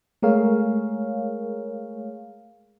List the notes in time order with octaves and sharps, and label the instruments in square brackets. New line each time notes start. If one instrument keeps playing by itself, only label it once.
[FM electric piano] G#3 A3 G#4 A#4 C#5 F5